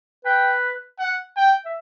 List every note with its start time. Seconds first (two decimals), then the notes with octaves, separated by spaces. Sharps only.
0.25 B4 G5
0.99 F#5
1.37 G5
1.65 E5